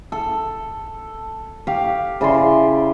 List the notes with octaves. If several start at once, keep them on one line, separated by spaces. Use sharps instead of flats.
A4
G4 F5 C#6
C#3 E4 D5 C6